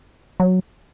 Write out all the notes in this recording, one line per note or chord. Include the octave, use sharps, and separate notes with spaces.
F#3